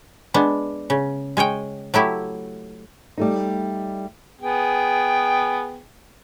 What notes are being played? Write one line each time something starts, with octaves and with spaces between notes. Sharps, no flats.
G#3 B3 D4
C#3
G#3 G#4 C#5 G5
F#3 A3 E4 G4
G3 A3 D#4
B3 G#4 G5